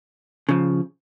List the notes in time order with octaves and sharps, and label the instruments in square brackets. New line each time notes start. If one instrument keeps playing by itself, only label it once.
[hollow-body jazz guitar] C#3 F3